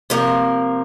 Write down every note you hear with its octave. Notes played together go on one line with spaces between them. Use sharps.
C3 F3 A#3